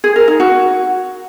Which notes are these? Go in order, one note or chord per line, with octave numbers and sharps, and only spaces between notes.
G#4
A#4
D#4
F#4